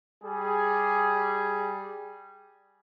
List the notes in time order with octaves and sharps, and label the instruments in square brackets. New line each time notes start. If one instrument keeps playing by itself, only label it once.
[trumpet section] G3 G#4